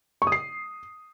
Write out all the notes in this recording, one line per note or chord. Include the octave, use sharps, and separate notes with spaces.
C#6
D#6
C7